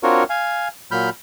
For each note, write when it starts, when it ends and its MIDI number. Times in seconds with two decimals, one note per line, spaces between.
0.03 0.24 60
0.03 0.24 62
0.03 0.24 65
0.03 0.24 66
0.03 0.24 70
0.03 0.24 73
0.30 0.68 77
0.30 0.68 80
0.91 1.10 46
0.91 1.10 54
0.91 1.10 83
0.91 1.10 89
0.91 1.10 91